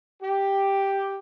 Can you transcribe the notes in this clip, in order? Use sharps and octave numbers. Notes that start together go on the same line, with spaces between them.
G4